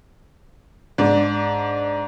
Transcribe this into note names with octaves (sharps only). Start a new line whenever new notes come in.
G#2 D4